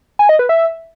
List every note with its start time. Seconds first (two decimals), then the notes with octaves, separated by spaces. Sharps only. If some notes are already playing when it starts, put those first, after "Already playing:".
0.19 G#5
0.29 D#5
0.39 B4
0.49 E5